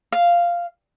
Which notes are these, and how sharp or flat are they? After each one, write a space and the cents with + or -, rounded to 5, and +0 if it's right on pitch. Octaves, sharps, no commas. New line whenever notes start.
F5 -5